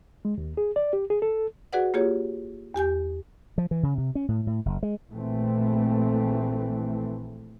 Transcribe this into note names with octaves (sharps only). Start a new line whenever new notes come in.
G#3
D#2
G#4
D5
G4
G#4
A4
F#4 G#4 B4 D5 F#5
A#3 F4 G4 G#4 C#5
E2 G4 G#5 G6
F3
E3
C#3
C3
C#4
A2
A2
F#1
G#3
A#1 E3 A3 C4